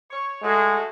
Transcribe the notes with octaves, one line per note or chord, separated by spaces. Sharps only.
C#5
G#3 A3 F#4